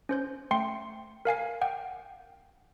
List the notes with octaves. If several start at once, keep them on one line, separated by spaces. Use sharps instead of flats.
C#4 C5 G6
A3 G5 C6 C7 C#7
A#4 F5 G#5 C7
F#5 G5